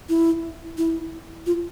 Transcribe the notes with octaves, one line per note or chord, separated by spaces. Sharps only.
E4
E4
F4